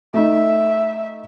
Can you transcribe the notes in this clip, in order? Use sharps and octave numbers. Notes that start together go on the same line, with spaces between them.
A3 D#4 E5